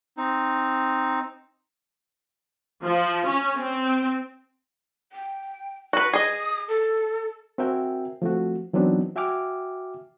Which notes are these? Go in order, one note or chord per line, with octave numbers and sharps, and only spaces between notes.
C4 D#4
F3
C#4
C4
G5
F#4 B4
G#4 D#5 D#6
A4
C4 F#4 A#4 E5 G5 G#5
F3 A3 C4 F#4
E3 F#3 B3 C4 D4 D#4
F#4 E5 G5 G#5 D6 F6